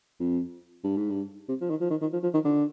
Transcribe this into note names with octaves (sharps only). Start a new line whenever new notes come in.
F2
G2
G#2
G2
C3
F3
D#3
F3
D#3
D#3
F3
F3
D#3
D3